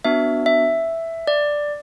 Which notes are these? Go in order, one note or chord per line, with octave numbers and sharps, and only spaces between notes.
B3 D4 F#4 E5
E5
D5